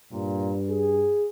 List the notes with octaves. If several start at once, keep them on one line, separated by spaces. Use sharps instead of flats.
G2 A#2
G#4